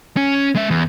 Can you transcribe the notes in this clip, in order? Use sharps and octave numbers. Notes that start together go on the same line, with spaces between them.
C#4
G#3 E5
E2